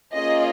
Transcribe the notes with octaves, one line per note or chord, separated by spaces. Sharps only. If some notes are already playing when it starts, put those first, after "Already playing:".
A#3 C#4 F4 G#4 D#5